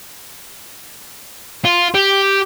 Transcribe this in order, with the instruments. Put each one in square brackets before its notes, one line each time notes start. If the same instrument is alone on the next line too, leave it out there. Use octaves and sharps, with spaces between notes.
[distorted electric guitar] F4
G4